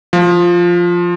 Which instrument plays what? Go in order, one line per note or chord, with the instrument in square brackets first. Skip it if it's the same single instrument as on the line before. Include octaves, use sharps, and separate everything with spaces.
[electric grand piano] F3